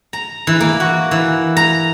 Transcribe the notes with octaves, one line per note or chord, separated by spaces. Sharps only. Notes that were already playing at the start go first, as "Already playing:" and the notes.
A#5
E3
A#3
F#4
E3
A#5